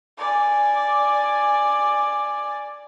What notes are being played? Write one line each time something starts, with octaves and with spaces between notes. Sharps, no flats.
D5 G#5